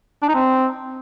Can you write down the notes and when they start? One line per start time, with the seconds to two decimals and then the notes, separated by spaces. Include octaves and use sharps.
0.23 D4
0.29 D#4
0.35 C4